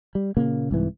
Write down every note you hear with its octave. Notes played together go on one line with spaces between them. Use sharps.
G3
A#2 C#3 A#3
C2 G#2 E3